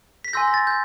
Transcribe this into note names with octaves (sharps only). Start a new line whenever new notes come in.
B6
G#5 C6 E6 G6 A#6
A#6
A6
G6